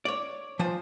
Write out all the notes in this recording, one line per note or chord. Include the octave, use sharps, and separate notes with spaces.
C#5 D5
F3 C5 G#5